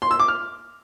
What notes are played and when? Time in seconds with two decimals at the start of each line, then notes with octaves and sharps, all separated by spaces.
0.02 C6
0.11 E6
0.20 D6
0.28 F6